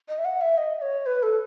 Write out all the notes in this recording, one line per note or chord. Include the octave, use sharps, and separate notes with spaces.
D#5
E5
F#5
E5
D#5
C#5
B4
A4